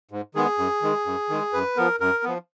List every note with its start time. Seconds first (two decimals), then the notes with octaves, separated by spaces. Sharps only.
0.11 G#2
0.35 D#3 G#3 B3 G#4
0.58 F#2
0.82 D#3 G#3
1.06 F#2
1.30 D#3 G#3
1.53 F#2 B4
1.77 F3 B3 A#4
2.00 F#2 A#4
2.24 F3 B3